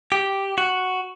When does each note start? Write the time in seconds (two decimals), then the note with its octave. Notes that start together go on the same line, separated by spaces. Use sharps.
0.12 G4
0.58 F#4